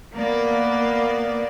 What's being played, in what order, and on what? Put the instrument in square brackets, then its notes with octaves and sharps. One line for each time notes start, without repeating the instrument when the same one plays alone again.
[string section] A#3 B3 D5